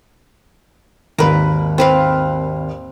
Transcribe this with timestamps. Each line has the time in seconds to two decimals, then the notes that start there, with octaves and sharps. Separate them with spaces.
1.18 G#1 D#2 A#4 B4
1.78 C4 B4 F5